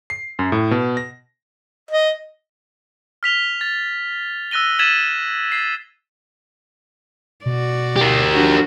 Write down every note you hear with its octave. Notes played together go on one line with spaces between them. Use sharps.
C7
F#2
A2
B2
A#6
D#5
F6 B6 F7 G7
A6
E6 F#6 A#6 D#7 G7
G#6 A6 B6 D#7 E7 F#7
A6 C7
B2 F#4 D5
G4 A#4
F3 D4 F#4